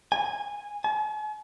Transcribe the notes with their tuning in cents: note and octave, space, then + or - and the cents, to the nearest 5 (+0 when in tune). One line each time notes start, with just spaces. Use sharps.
G#5 -15
G#5 +45